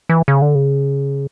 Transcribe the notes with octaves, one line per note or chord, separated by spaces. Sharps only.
E3
C#3
D3
C#3